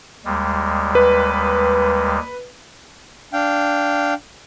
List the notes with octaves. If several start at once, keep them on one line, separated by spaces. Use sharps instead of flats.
D#2 G3 G#3
B4
D4 F5 G5